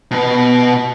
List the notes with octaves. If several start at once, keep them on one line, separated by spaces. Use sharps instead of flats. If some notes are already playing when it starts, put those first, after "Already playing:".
B2 B4